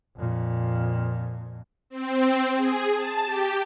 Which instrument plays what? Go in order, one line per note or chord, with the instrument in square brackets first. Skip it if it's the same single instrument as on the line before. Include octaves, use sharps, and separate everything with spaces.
[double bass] F2 A#2
[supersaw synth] C4
G#4
A5
G4